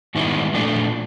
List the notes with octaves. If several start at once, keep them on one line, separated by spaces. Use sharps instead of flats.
G#2 D#3 G3 B3 E4
A#2 F3 A3 D4